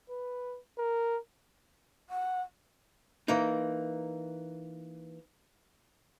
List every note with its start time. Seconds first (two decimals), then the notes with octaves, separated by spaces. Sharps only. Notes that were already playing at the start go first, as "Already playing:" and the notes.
0.10 B4
0.78 A#4
2.10 F#5
3.28 E3 A#3 D#4